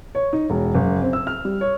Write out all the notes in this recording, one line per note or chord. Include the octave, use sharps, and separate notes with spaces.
C#5
D#4
E1
F#1
C4
E6
F6
G3
C#5